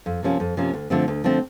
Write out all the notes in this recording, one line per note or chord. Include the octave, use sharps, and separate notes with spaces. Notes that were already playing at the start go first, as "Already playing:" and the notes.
F2
C3 F3 A#3 C#4
F2
C3 F3 A#3 C#4
D2
D3 F3 A3 C4
D2
D3 F3 A3 C4